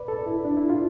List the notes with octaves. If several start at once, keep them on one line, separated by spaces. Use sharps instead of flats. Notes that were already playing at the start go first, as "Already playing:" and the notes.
Already playing: B4 D5
A4
E4
D4
E4
F4